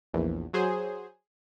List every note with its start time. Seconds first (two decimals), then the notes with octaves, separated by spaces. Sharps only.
0.13 A#1 E2
0.53 F#3 G#4 C5